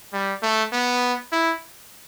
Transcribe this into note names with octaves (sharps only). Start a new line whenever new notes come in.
G3
A3
B3
E4